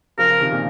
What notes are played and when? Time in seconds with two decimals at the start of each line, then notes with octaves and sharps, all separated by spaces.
0.18 C#3 F3 A#4
0.30 C#3 F3
0.40 C3 D#3
0.52 A#2 C#3